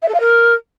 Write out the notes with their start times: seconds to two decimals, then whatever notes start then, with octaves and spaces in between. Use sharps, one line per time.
0.02 E5
0.08 A4
0.14 F5
0.20 A#4